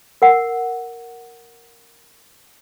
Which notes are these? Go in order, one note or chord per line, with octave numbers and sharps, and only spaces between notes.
A#4 F#5